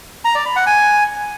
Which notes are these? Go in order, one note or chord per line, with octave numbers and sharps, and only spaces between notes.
A#5
D5
B5
F#5
G#5